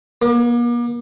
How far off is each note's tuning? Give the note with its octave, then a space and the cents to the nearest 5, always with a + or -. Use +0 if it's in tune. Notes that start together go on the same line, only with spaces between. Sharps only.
A#3 +45